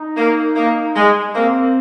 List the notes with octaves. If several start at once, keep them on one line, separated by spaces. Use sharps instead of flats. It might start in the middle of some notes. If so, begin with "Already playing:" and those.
Already playing: D#4
A#3
A#3
G#3
A#3 C4